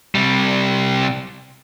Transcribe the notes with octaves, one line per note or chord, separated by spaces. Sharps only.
C3 G3